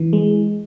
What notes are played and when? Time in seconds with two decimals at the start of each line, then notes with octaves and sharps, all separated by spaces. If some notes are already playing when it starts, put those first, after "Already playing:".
Already playing: E3
0.13 G#3